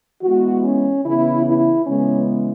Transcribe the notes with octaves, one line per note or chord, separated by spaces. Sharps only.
E3 G#3 B3 F#4
C#4
C#3 E3 B3 E4
E4
C#3 E3 G#3 B3 C#4